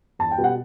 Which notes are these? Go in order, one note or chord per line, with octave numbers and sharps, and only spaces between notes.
E2 A5
G5
B2 G3 B3
F#5